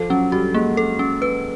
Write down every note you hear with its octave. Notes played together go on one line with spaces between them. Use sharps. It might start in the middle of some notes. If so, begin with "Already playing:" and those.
Already playing: F3 A4
F#3 C#4
G3 F#4
G#3 A#3
A4
C#4
B4